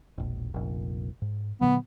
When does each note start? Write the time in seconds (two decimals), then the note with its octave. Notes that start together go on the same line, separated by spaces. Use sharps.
0.18 E1 A#1
0.54 F1 A#1
1.22 G#2
1.61 A#2 D3 F#3 B3